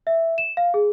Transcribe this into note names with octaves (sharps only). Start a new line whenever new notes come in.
E5
E7
F5
G#4